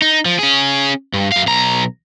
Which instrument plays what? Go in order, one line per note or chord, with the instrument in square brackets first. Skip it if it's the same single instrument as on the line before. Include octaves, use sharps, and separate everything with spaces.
[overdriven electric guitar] D#4
F3
C#4 G#4
G2
F#2 F5
B1 A#5